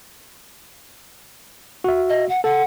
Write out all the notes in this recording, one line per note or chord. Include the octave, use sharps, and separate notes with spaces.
F#4 E5
D#5
F#5
A4 F#5